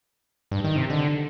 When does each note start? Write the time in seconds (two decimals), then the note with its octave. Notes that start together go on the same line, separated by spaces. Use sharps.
0.52 G2
0.64 D#3
0.76 C3
0.90 D3